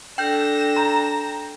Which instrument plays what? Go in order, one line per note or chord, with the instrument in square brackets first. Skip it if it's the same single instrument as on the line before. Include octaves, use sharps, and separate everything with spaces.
[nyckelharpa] D4 A4 [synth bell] G5 G6 [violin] A#6 E7
[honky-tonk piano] A#5